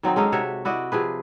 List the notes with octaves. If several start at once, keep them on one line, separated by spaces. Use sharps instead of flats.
D#3 F#3 C4 D#4
G#3 C#4 D#4 A4
C3 F#4 C#5 E5
E4 F#4 D5 D#5
C3 F3 G#4 B4